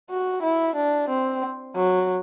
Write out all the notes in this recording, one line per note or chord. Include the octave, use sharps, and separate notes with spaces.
F#4
E4
D4
C4
F#3